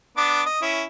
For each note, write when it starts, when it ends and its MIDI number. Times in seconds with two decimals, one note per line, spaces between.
0.17 0.42 59
0.17 0.42 62
0.17 0.42 86
0.46 0.60 75
0.62 0.83 61
0.62 0.83 64